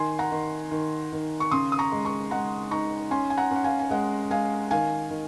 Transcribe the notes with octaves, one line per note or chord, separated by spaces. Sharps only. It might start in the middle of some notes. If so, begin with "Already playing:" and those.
Already playing: D#3 G#5 C6
F#5 A#5
D#3
D#3
D#3
C#6
C#3 C6 D#6
D#6
A#5 C#6
G#3
A#5 C#6
G#3 F#5 A#5
D#4 A#5 C#6
C#4 G#5 C6
G#5
F#5 A#5
C#4 F#5
F5 G#5
G#5
G#3 D#5 F#5
G#3 F5 G#5
D#3 F5 G#5
D#3